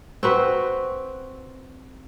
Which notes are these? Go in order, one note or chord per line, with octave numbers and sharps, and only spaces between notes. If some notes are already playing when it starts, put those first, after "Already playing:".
C4 F#4 B4